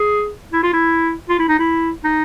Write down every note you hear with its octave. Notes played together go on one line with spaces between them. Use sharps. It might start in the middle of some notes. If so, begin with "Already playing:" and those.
Already playing: G#4
E4
F4
E4
F4
E4
D#4
E4
D#4